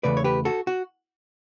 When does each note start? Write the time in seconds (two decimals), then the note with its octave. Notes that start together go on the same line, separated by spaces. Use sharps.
0.03 E2 C#3 E3 A3 B4 D5
0.17 C#5
0.24 G4 B4
0.45 F#4 A4
0.67 F#4